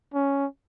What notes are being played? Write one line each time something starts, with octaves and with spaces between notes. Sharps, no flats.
C#4